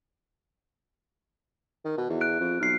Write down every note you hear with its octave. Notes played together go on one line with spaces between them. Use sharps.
D#3
B2
E2
F#6 D7
F2
B1 F6 C7